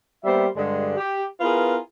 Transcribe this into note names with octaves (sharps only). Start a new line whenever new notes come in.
G3 A#3 B3 C5 D5 E5
G2 D3 G#3
G4
B3 E4 F4 G#4 A#4 B4